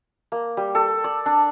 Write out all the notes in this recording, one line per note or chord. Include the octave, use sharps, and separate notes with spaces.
A#3
G3
A4
D5
D4